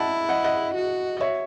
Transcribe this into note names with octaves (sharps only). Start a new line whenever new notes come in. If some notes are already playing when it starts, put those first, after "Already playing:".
Already playing: E4 F#5 A5
D#5 F#5
D#5 F#5
F#4
D#5
C#5 E5